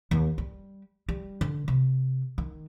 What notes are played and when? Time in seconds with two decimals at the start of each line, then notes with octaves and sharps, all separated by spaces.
0.11 D#2
0.38 G3
1.09 G3
1.41 D3
1.68 C3
2.38 D#3